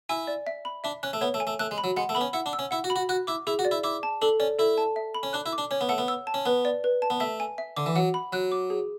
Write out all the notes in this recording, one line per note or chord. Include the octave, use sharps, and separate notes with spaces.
E4 G#5
D5
E5
B5
D4 E5
C#4 F#6
A3
B3 C#5
A3
G#5
A3
A3 F#6
G#3
B5
F#3
G#3 F#5
A3
B3 B5
C#4
E4 F#5
D4
E6
C#4
E4 F#5
F#4
B5
F#4
F#4 F#6
E4 D6
E4 G#4
F#4
D5
E4
E4 D6
A5
D4 A4
C#4 D5
E4 A4
A5
E5
B5
C#4
D4 F#6
E4
D6
D4
C#4 C#5
B3
A3 F#5
B3
E6
A5
C#4
B3 B4
D5
B4
A5
B3
A3 E5
G#5
E5
D3 D6
E3
F#3 F#5
B5
F#3 F#6
D6
G#4